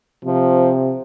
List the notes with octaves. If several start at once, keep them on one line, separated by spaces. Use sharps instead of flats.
C3 F3